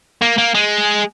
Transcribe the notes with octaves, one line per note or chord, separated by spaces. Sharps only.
A#3
A#3
G#3